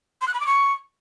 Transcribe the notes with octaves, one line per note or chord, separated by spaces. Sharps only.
C6
F#6
B5
D6
C#6